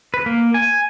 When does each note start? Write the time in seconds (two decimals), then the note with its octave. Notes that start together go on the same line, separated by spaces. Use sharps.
0.14 B4
0.26 A#3
0.54 G#5